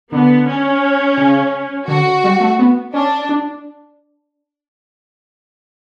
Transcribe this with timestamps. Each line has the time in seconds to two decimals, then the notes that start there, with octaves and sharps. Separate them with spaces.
0.12 D3 B3
0.47 C#4
1.17 C#3
1.88 D3 F#4
2.24 G3
2.40 A3
2.59 B3
2.93 C#4 D4
3.29 D4